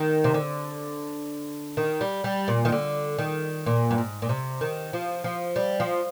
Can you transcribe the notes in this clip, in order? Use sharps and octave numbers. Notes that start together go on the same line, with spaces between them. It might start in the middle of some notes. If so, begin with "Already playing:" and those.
Already playing: D#3
C3
D3
D#3
G3
G3
A#2
D#3
D3
D#3
A#2
G2
G#2
A#2
C3
D#3
F3
F3
G3
F3